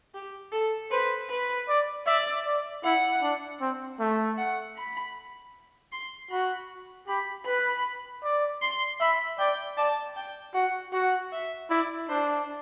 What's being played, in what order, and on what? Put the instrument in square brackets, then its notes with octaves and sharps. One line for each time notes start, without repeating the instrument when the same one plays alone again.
[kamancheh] G4
A4
[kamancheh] B4 [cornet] C5
[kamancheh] B4
[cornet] D5
[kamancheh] D5 [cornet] E5
[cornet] D5
[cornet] E4 [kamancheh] F#5
[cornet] D4
C4
A3
[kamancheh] F#5
B5
C6
[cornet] F#4 [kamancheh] B5
[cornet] G4 [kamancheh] B5
[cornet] B4 [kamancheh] B5
[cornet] D5
[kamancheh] C6
[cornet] E5 [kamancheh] B5
[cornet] D5 [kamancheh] G5
[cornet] D5 [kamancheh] A5
[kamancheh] G5
[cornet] F#4 [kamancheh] F#5
[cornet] F#4 [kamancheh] F#5
[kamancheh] E5
[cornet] E4 [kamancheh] D5
[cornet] D4 [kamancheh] C5